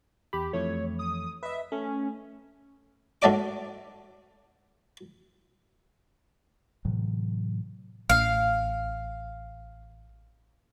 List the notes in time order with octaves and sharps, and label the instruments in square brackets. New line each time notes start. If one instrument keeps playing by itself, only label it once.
[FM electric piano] E2 B5 [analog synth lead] G4
[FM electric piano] F2 E3 A3 [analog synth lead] C#5
[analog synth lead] D#6
[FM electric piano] B4 D#5 [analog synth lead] E5
[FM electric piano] A3 [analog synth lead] C#4
[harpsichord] G#2 F#3 A3 D5 D#5 D6
[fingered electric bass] A2 C3 E3 F#3
[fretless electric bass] A1 [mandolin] F5